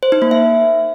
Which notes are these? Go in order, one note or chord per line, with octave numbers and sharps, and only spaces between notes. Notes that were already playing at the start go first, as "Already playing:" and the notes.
C5
D#4
A#3
E5